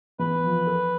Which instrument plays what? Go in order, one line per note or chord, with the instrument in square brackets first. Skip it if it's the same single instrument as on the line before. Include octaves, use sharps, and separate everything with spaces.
[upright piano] E2 [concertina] B4
[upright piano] F3
A4